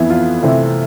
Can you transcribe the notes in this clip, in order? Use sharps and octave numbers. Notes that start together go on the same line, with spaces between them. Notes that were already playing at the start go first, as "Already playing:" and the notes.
Already playing: F2 E3 B3 E4
F4
C3 E3 A3 C4